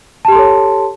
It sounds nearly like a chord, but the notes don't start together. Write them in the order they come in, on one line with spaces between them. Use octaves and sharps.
A5 G4 C6 A4 C#5